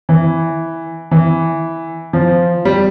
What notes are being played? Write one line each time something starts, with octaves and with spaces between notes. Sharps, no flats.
E3
E3
F3
G3